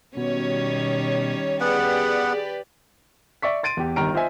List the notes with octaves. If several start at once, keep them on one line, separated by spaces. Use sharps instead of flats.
B2 D#3 G3 C#4 C#5
B3 G4 G#4 B4 D5 F#5
D5 E5 C#6 B6
C6 A6 D7 D#7
E2 G4
G1 D#3 G3 A#5 F6 D7
F4 C5 D#5 E5 G#5